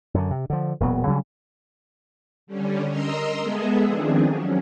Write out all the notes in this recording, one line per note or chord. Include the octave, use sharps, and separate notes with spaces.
F#2 D3
C3
D3 F3
E1 A#2 F#3 B3
C#3 F#3 G3 C#4
D3 G3 C#4
A#4 D#5 A#5 C6 E6
G#3 B3 G#4 A4 E5
D#3 F3 C4 D4 G#4
F#3 C#4